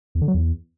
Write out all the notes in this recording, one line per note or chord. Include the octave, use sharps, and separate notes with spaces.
E2
D3
F#3
E2